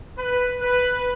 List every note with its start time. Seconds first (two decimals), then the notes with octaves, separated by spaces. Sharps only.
0.18 B4
0.63 B4